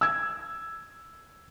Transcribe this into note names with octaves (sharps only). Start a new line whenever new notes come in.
E6 G#6